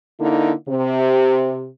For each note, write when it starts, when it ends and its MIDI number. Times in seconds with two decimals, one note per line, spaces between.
0.19 0.53 50
0.19 0.53 58
0.19 0.53 63
0.19 0.53 64
0.68 1.67 48